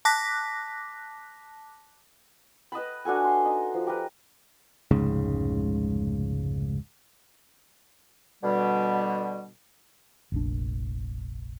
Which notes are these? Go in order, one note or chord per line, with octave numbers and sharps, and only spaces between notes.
A5 D6 F#6 A#6 B6
B4 D#5 A5 B5
D4 F#4 A4 G#5
C6
D#4
F3
G4 A#4 B4
F1 C#2 G#2 C#3
B2 D3 G3
F1 A#1 D4